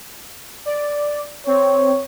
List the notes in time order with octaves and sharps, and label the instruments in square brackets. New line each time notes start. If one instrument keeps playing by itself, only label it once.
[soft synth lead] D5
[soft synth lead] C4 [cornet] C#5